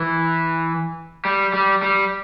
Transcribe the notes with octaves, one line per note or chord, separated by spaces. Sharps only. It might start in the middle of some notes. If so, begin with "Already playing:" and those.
Already playing: E3
G3
G3
G3